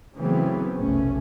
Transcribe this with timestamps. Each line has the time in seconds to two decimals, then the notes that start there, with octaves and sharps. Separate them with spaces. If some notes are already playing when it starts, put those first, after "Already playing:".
0.15 C#3 E3 F#3 A3 B3 C4
0.77 F1 B1 A3 C#4